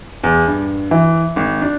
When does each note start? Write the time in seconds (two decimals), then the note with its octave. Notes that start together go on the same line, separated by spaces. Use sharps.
0.23 E2
0.47 G2
0.91 E3
1.36 G#1
1.62 D4